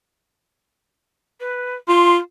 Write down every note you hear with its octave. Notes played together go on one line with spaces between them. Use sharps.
B4
F4 C6